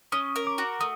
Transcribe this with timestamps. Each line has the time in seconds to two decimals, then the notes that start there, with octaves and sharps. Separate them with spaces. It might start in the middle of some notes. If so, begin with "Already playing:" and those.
0.12 C#4 D#6
0.36 A#4
0.47 D6
0.58 F#4
0.81 A3 D#6